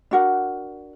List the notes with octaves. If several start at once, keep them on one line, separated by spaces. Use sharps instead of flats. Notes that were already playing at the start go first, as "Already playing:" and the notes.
D4 F#4 A#4 F#5